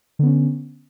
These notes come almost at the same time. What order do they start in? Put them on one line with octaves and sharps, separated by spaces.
D3 B3 C#4